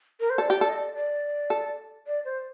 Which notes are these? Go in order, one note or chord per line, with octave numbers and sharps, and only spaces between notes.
A#4
C5
A4 D5
G4
A4 D5
D#5
D5
D5
A4
D5
C5